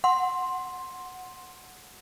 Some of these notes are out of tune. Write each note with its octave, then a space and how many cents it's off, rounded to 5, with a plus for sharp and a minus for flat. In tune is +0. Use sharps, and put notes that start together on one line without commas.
F#5 -5 C6 +10